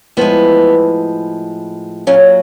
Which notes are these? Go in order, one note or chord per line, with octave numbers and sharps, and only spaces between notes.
A2 F3 G#3 B3
A#2 F#3 C#4